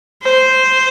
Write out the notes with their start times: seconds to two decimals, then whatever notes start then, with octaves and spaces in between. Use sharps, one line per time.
0.23 C5